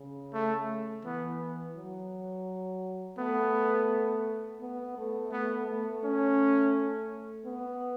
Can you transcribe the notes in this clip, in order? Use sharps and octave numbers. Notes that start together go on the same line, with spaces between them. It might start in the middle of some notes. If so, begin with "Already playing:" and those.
Already playing: C#3
A3
E3 B3
F#3
A3 B3
B3
A3
A3 B3
A3
C#4
B3